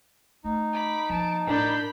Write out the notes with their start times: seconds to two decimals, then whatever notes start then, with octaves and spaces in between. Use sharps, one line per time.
0.44 A3 C#4 D#4
0.73 B5 D6
1.09 F3 A#3 A5 D7
1.47 A2 D4 A#4 B5 G6